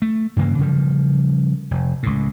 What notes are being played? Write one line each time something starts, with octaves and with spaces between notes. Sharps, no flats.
A3
G2 C#3 E3 A#3
C#3 E3 F3 G3
F1
C#2 A2